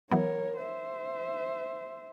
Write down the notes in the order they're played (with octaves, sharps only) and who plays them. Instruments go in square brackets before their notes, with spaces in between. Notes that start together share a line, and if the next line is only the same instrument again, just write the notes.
[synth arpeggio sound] E3 F#3 B3 [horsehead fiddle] A#4 C#5
[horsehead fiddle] C5 E5